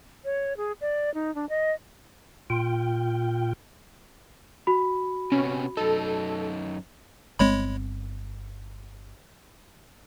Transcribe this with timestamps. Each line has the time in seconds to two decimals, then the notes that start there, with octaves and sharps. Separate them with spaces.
0.25 C#5
0.57 G#4
0.81 D5
1.14 D#4
1.35 D4
1.49 D#5
2.50 A#2 F4 G5
4.67 F#4 B5
5.32 C3 B3 C#4
5.77 F#2 D#4 A4
7.39 G1 G#3 C4 C#5 B5